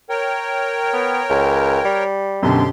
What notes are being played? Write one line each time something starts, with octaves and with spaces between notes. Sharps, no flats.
A#4 C#5 G5
B3
C#2
G3
F#2 B2 D3 C4 G4 C6